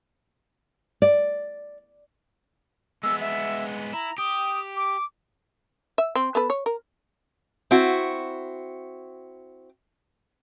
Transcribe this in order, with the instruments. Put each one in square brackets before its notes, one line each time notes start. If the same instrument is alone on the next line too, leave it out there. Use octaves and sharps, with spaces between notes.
[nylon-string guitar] D5
[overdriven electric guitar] G#3 B3 [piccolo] E6
[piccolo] E5
[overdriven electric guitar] E4 [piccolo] A#5
[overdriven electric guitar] G4 [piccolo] D#6
[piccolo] D6
[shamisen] E5
C4
B3 A4 B4
C#5
A#4
[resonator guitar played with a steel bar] C4 E4 F#4